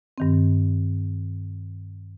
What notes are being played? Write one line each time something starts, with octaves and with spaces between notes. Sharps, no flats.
G2 D#3 C4